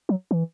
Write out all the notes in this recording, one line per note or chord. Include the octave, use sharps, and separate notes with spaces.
F#3
E3